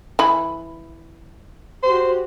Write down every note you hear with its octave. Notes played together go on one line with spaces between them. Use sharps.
E3 B5
F#4 G4 C5